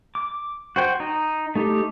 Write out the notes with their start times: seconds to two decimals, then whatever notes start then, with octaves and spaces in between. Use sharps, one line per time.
0.15 D6
0.76 F#4 C5 G5
1.00 D#4
1.55 A3 D#4 G4